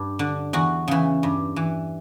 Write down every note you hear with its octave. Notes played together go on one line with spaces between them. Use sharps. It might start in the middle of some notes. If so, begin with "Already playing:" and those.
Already playing: G2
D3
E2 F#4
C#3 E3
G2
E3